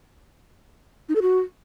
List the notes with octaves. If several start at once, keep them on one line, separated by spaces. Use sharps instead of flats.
D#4
A4
F#4